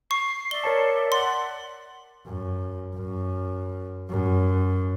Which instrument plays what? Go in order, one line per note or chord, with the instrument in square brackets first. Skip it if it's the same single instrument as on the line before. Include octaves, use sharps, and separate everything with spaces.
[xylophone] C#6 [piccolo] C7
[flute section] D5 E5 [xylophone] G7
[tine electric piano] A#4 C#5 A5 [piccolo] C#7
[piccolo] F#5 [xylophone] C6
[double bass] F#2
F#2
F#2